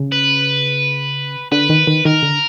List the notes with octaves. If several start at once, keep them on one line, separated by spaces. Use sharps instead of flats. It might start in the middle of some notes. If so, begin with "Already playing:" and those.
Already playing: C#3
B4
D3 B4
D#3
D#3
D#3 A#4
D3